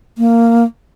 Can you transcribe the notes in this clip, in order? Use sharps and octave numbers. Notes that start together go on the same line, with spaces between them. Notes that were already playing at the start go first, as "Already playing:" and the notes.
A#3